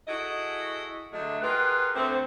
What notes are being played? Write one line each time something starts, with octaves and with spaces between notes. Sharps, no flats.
E4 F#4 G#4 A4 D#5
D3 F#3 G#3 A3
F4 G4 G#4 A#4 B4 F#5
D2 D3 A3 C4